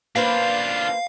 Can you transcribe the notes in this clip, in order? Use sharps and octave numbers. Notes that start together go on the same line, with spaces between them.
A#3 D4 F4 B4 C5 F5